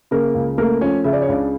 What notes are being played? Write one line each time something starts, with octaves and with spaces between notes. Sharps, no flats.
C#3 A#3 A#4
C#2
A3 A#3 A#4
F3 C#4 C#5
C#3 E5
D5
C#5
C#2 D4 D5